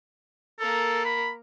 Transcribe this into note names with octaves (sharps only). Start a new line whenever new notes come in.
A#3 A4 A#4
B5